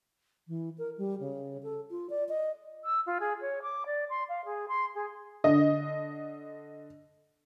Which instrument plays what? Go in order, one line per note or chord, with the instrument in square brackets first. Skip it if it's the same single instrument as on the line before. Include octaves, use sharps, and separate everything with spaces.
[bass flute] E3
A#4
G3
C#3
A4
F4
D5
D#5
[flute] E6
F4
G#4
C#5
D6
D5
C6
F5
G#4
C6
G#4
[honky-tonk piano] D3 D#5